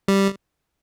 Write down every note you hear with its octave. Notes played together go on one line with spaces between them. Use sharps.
G3